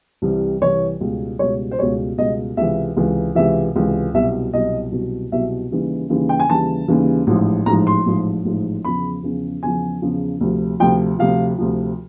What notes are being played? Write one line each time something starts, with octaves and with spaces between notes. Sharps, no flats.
C2 C3 E3 G3
C2 C3 E3 G3 C#5
C#2 B2 G3
C#2 B2 G3 C#5
C5
C#2 B2 G3 C#5
C#2 B2 G3 D#5
C#2 C3 E3 E5
C#2 C3 E3
C#2 C3 E3 E5
C#2 C3 E3
C2 B2 F#3 E5
C2 B2 F#3 D#5
C2 B2 F#3
C2 B2 F#3 E5
D#2 C#3 E3 G3
D#2 C#3 E3 G3
G5
G#5
D#2 C#3 E3 G3 A5
D#2 C#3 E3 G3
A1 G#2 F3
A1 G#2 F3 A#5
C6
A1 G#2 F3
A1 G#2 F3
E2 C#3 F3 B5
E2 C#3 F3
E2 C#3 F3 G#5
E2 C#3 F3
D2 C3 F3
D2 C3 F3 G5
D2 C3 F3 F5
D2 C3 F3